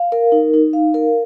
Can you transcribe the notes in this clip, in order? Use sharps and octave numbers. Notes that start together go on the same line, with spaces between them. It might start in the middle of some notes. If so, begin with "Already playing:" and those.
Already playing: F5
A#4
D#4
D#4
F5
A#4